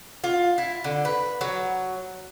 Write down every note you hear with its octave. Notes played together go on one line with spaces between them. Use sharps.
F4
E4
D3
B4
F#3